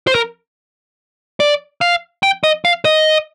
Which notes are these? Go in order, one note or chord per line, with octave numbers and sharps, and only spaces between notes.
C5
A#4
D5
F5
G5
D#5
F5
D#5